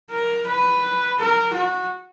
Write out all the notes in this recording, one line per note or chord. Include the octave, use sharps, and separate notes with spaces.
A#4
B4
A#4
F#4